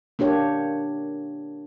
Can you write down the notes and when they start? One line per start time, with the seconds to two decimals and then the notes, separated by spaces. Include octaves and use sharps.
0.19 A#3 D4 G4 C#5